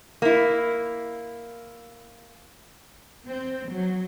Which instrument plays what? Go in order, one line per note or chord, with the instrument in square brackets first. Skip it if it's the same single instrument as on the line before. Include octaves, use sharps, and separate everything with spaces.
[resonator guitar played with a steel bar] A#3 E4
[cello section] C4
F#3